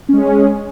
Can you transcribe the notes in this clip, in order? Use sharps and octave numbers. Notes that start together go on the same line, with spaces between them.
G#3 C#4 G#4